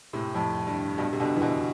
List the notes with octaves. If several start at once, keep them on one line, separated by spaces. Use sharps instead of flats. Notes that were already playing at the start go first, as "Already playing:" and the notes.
A2 C3
F2 A2
G2
G2 B2
C3
B2 D3
E3
B2 D3